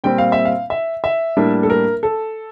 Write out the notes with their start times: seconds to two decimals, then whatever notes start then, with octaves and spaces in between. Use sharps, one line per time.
0.04 A#2 G3 C4 G5
0.18 F5
0.32 E5
0.45 F5
0.70 E5
1.04 E5
1.37 A2 G3 A#3 D4
1.63 A4
1.70 A#4
2.03 A4